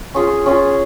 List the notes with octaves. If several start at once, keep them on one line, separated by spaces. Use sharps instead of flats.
C#4 F4 G#4
C#4 F4 G#4